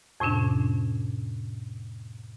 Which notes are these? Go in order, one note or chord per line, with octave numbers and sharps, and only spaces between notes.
F2 A2 C3 C#4 D4